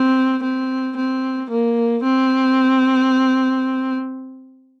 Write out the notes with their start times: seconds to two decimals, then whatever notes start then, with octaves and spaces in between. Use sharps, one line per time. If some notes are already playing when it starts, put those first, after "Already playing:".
Already playing: C4
0.43 C4
0.96 C4
1.50 A#3
2.03 C4